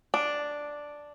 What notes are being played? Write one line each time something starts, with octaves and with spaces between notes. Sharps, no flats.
D4